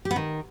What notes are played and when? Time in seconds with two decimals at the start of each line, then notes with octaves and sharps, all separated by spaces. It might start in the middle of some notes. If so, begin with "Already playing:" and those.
0.05 G4
0.11 B3
0.16 D#3